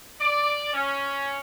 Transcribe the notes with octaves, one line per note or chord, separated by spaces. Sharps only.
D5
C#4